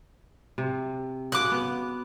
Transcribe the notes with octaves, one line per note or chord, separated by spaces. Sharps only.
C3
C#3 F#4 D6 F#6
B3